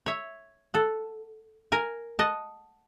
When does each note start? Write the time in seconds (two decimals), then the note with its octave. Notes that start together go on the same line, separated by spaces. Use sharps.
0.06 C#5 E5
0.74 A4 F#5
1.72 A#4 G#5
2.19 D#5 F#5 A5